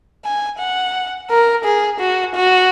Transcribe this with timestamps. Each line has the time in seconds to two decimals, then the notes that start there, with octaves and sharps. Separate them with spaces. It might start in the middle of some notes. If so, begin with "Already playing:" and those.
0.25 G#5
0.59 F#5
1.30 A#4
1.65 G#4
2.00 F#4
2.35 F#4